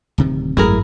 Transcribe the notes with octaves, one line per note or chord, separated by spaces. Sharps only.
D1 C3 D#3
G#1 F#2 F#3 G#3 A3 E4 G#4 A#4